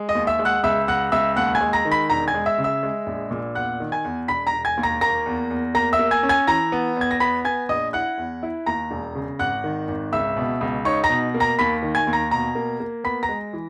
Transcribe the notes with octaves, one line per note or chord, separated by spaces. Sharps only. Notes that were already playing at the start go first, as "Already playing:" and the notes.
Already playing: G#3
D#5 D#6
D#2
E5 E6
G#3
F#5 F#6
C#2 E5 E6
C#2 F#5 F#6
C#2 E5 E6
D#2 F#5 F#6
G#5 G#6
G#3
A#5 A#6
D#3
B5 B6
E1 A#5 A#6
G#5 G#6
G#3
E5 E6
C#3
E5 E6
G#3
A#1
A#2
E2 F#5 F#6
D#3
G#5 G#6
E2
E1 B5 B6
A#5 A#6
E1
G#5 G#6
D#2
A#5 A#6
A#3 A#5 A#6
E2
E2
A#3 A#5 A#6
E5 E6
A#3
G#5 G#6
C#4
G#5 G#6
E3 A#5 A#6
B3
E2 G#6
A#6
B3 B5 B6
B3 G#5 G#6
A#1 D#5 D#6
E4 F#5 F#6
E2
E4
D#2 A#5 A#6
E1
C#3
G#1 F#5 F#6
D#3
G#1
C#2 E5 E6
B2
C#2
D#4 C#5 C#6
A#5 A#6
B2
A#3
A#5 A#6
D#2 B5 B6
D#3
G#5 G#6
D#2
A#5 A#6
B2 A#5 A#6
A#3
A#3
B3 B5 B6
A#5 A#6
G#3
E3